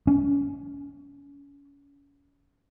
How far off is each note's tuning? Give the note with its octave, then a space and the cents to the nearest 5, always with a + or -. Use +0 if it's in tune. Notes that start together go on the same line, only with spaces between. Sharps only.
C#4 +30